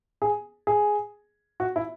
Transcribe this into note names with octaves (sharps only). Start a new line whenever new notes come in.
G#4
G#4
F#4
E4